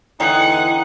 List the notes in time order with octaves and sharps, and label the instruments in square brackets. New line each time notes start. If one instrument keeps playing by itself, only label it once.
[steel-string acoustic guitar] E2 D3 E3 [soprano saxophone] D#4 [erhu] F#5 [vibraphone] G5